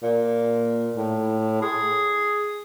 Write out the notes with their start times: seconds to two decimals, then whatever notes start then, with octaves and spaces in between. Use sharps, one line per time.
0.03 A#2
0.97 A2
1.62 G#4